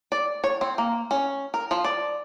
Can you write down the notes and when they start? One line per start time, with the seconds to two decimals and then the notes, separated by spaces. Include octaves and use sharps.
0.12 D5
0.44 C#5
0.61 C4
0.78 A#3
1.11 C#4
1.54 A#4
1.71 F3
1.84 D5